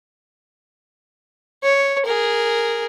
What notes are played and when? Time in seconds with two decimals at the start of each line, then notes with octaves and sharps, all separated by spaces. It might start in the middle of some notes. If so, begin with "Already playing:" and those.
1.63 C#5
2.06 G#4 A#4